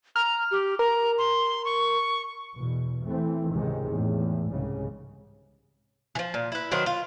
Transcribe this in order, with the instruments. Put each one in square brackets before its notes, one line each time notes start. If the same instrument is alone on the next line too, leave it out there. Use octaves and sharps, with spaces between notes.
[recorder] A#5 [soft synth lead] F6
[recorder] G4
[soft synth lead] A#4 [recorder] A#5
[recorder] C6
C#6
[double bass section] E2 B2
E3 A3 C4
C#2 G#2 C3 D#3 G#3
E2 A2
C2 G#2 C#3
[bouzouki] E3 F3
A#2
E4 B4
D#3 F#3 C4 B4
F4